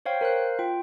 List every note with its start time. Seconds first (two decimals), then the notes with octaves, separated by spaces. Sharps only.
0.06 C5 C#5 F5 G5
0.21 A#4 C5 F5 F#6
0.59 F4 G5